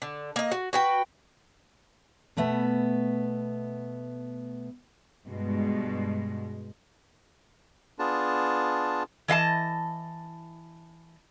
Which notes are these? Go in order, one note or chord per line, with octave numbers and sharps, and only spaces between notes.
D3
A#3 D#5
F#4
F#4 B4 G5
B2 A3 B3 E5
G2 B2 G#3
B3 D4 F4 G#4 A5
E3 D#5 F5 A5